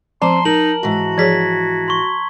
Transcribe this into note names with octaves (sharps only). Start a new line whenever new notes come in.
F3 C4 A5 A#5 C6
D#4 A#4 F#7
G#2 E3 F#4
F3 G#4 C#5 G#6 B6
C6 C#6